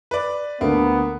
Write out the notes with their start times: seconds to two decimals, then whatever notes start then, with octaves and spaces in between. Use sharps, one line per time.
0.11 B4 D5
0.61 D2 D3 A#3 B3